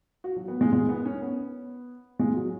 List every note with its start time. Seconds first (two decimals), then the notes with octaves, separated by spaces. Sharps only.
0.24 F#4
0.36 F#3
0.48 B3
0.61 G#3
0.73 G#3
0.89 B3
1.05 C#4
1.22 B3
2.19 G#3
2.36 F#3